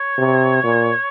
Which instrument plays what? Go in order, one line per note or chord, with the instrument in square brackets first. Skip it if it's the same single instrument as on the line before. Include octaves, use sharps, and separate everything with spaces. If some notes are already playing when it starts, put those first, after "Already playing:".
Already playing: [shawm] C#5
[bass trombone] C3
A#2